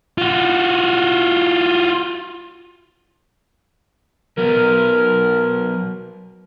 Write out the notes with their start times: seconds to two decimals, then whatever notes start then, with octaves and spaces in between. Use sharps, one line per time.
0.18 F4 F#4
4.38 F#3 B3 A#4